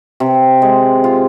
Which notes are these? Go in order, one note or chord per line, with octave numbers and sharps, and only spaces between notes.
C3
G#3
F4